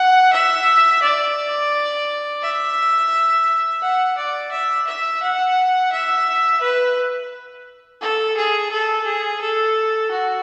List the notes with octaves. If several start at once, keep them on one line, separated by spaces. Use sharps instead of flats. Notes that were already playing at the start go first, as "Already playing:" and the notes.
Already playing: F#5
E5
D5
E5
F#5
D5
E5
E5
F#5
E5
B4
A4
G#4
A4
G#4
A4
F#4